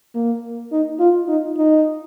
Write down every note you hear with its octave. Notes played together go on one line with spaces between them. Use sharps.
A#3
D#4
F4
D#4
D#4